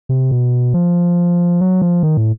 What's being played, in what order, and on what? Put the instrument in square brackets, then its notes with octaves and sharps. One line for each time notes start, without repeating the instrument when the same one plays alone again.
[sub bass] C3
B2
F3
F#3
F3
D#3
A2